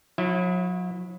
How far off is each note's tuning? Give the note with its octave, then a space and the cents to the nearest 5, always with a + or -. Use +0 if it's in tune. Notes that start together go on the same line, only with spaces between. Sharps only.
F#3 -40 E4 +0 E5 +20